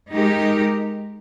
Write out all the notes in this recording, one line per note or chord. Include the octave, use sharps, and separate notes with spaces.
G#3 D#4 G4 A#4